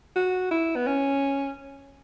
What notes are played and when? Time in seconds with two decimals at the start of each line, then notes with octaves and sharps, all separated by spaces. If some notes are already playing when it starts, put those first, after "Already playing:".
0.16 F#4
0.51 E4
0.76 B3
0.87 C#4